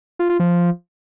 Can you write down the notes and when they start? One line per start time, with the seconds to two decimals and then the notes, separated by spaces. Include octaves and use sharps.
0.19 F4
0.29 F4
0.40 F3